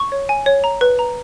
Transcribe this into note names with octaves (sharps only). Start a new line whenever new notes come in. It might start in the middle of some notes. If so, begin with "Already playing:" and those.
Already playing: C#6
C#5
G#5
C#5
A#5
B4
A#5